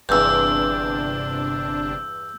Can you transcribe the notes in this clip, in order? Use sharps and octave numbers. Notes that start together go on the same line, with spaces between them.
G1 E2 G2 C3 D4 E6 G6